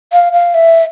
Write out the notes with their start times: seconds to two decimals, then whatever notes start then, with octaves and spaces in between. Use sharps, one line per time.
0.12 F5
0.33 F5
0.54 E5